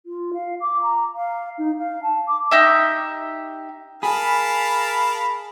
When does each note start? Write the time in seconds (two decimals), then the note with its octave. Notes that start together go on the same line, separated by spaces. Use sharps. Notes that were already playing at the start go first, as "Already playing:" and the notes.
0.06 F4
0.34 F5
0.61 D6
0.82 A#5
1.15 F5
1.58 D#4
1.78 F5
2.03 A5
2.28 D6
2.51 D#4 G4 E5
4.03 G#4 A#4 F5 A5 B5